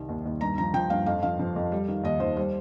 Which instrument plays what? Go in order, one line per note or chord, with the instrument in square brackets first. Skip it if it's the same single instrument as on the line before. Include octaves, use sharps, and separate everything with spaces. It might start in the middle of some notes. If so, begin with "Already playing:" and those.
Already playing: [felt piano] C2 D#3 G3
D#2
D#2
G2 A#5
F3 A#5
F3 G5
G2 F5
F2 F5
F3 F5
F3
F2
G3
D#3
D#2 D#5
D#2 C5
G3 C5